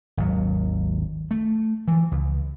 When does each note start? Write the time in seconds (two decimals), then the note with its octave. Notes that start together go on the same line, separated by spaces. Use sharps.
0.17 G#1 D#2 F#3
1.31 A3
1.88 E3 F3
2.12 C#2